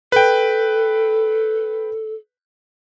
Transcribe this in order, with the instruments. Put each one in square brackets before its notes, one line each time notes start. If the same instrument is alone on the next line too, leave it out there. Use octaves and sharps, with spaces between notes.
[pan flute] A4 [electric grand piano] B4 G5